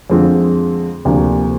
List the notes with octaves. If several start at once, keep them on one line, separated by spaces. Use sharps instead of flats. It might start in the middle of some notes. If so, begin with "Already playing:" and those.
F2 D3 G#3 C4 F4
D2 C3 F3 A#3 D4